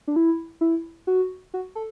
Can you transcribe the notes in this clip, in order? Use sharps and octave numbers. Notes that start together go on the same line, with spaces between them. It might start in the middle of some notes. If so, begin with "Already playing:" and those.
D4
E4
E4
F#4
F#4
A4